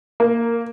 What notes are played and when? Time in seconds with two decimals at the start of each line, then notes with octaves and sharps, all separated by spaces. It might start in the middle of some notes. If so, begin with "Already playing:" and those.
0.20 A#3